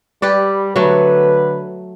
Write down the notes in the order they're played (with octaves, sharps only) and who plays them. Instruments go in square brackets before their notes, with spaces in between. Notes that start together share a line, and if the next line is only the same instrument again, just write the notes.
[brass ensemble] G3 [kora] G4 B4 D5
[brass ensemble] D3 B4 [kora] F#3 A3